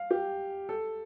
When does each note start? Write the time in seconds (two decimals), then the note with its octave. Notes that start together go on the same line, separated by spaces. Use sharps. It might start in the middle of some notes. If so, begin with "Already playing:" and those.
Already playing: F5
0.11 G4
0.69 A4